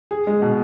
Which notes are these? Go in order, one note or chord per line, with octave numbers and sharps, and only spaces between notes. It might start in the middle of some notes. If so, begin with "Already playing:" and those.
G#4
G#3
B2